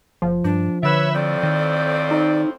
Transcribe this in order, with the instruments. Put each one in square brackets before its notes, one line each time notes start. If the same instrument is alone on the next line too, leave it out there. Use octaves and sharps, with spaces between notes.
[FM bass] F#1 [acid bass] F3
[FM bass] G2 [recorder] D4
[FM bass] D3 [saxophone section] B4 E5 [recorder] C#5
[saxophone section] F2 A2 C4 [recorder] D5
[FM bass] D#3
[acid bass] D#4